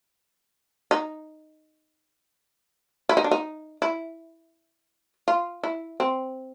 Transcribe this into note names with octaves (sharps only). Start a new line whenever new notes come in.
D#4
E4
D#4
D4
D#4
E4
F4
E4
C4